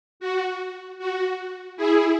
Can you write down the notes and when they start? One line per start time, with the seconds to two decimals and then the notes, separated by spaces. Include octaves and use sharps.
0.20 F#4
0.99 F#4
1.77 E4 G#4